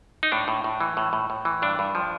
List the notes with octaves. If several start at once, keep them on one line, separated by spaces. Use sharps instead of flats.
D#4
A2 D4
A2
A2
E3
A2
A2
A2
E3
G2 D4
G2
F3